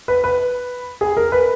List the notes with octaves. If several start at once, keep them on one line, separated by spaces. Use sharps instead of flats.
B4
B4
G#4
A#4
B4